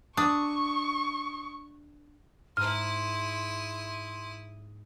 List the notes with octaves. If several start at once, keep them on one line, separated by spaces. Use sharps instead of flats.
D4 C#6 D#6
G#2 E4 A#5 C6 D#6 F6